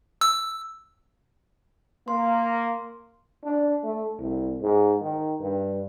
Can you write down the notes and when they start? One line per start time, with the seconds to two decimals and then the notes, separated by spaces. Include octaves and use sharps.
0.21 E6
2.08 A#3 C6
3.44 D4
3.84 A3
4.18 C2
4.62 G#2
5.01 D#3
5.40 G2